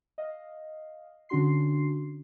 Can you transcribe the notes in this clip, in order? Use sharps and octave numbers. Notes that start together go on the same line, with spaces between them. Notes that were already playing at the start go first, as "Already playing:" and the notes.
D#5 F5
D3 C#4 D4 F#4 C6 C7